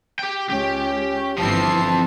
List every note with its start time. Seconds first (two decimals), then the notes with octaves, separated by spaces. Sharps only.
0.19 G4 G5
0.50 C#2 C#4 G4
1.38 G1 E3 F3 C4 A5 C7